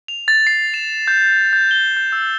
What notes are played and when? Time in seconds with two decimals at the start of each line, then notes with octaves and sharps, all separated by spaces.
0.08 F7
0.28 A6
0.47 C7
0.74 E7
1.08 G6
1.53 G6
1.71 G7
1.97 G6
2.12 E6